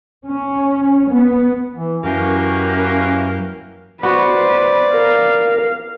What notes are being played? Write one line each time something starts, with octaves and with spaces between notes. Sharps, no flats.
C#4
B3
E3
F#2 E3 F#3 A#3 C#4 F#4 G4 A#4
B3 F#4 B4 C5 D5
A#4 F5